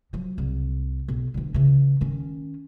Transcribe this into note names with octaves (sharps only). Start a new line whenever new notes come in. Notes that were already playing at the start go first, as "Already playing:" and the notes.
F3 F#3
C2
B1
D3 E3
C#3 E3
D#3 C#4